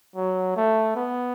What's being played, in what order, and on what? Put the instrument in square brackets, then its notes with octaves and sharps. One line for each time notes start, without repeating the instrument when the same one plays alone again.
[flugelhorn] F#3
A3
B3